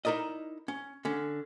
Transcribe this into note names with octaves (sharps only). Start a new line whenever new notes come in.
D#4 E4 A#4 D5 D#5
C#4
D3 C#4